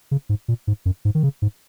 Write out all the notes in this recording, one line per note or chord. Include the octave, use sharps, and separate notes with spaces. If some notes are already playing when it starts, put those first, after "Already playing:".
C#3
G#2
A#2
G#2
F#2
G#2
D#3
C#3
G#2